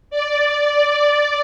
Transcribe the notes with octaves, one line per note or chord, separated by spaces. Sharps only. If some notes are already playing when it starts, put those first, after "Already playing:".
D5